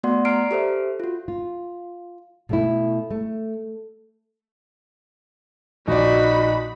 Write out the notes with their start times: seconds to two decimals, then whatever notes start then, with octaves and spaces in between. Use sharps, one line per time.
0.04 A3 B3 F#4 D5 F#5 C6
0.25 D5 A#5 F6 C7 D7
0.51 G4 A4 C5 E5
1.00 F4 F#4
1.28 F4
2.49 B2 A3 E4
3.11 A3
5.88 A#1 D#4 F#4 D5 B5